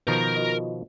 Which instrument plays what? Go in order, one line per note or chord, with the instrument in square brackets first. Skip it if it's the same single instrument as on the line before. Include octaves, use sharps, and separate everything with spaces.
[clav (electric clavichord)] B2 D#3 F3 [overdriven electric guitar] A#4 A#5 [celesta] G6
[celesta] F4 F#4 D#5